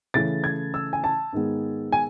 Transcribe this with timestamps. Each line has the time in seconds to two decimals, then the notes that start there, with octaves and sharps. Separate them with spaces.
0.14 C#3 E3 A3 C#4 A6
0.44 G#6
0.74 E6
0.93 G#5
1.04 A5
1.33 G#2 D#3 G#3 B3
1.92 G#5